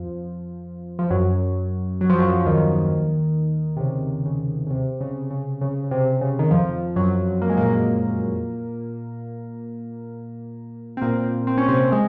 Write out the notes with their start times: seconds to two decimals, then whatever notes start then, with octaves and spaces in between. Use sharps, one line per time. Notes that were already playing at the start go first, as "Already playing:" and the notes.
Already playing: F2 F3
0.99 F3
1.11 F#2 F#3
2.01 F#3
2.10 F3
2.19 F#2 F#3
2.40 F3
2.46 D#2 D#3
3.77 C3
3.81 C#3
4.26 C#3
4.67 C#3
4.71 C3
5.01 C#3
5.31 C#3
5.61 C#3
5.84 C#3
5.91 C3
6.21 C#3
6.39 D#3
6.51 F2 F3
6.96 F#2 F#3
7.42 A#3
7.49 G#3
7.57 A#2 A#3
10.97 C4
11.02 A#2 A#3
11.47 C4
11.58 C#4
11.68 C3 C4
11.92 G#3